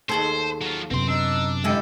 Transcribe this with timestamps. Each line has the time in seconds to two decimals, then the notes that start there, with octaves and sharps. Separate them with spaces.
0.09 D#2 G#4 A4 C5
0.61 F#3 F4
0.91 F#2 C3 B3 C4 C6
1.09 D4 D#4 E6
1.64 D3 G#3 E4 G4 A4